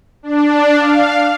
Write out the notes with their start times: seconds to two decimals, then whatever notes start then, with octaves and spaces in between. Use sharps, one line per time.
0.23 D4
0.78 F5